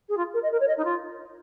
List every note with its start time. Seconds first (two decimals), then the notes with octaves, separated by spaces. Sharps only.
0.09 G#4
0.17 F4
0.33 A#4
0.42 D#5
0.52 A#4
0.60 C#5
0.67 D#5
0.77 D#4
0.84 F4